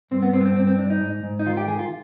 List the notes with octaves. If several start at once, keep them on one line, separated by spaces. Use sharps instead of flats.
G2 C4
B3
G2 C4
B3
C4
G2 C4
C4
G2 D4
D#4
G#2
G#2
D#4
D#3 F4
G4
D#3 G#4
F4